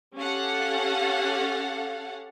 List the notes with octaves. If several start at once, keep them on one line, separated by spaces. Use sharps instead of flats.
C#4 G4 A4 F5 F#5